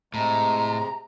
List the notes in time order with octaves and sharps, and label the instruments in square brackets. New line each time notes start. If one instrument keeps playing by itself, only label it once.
[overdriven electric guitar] A2 [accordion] C3 G#3 [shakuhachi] A#5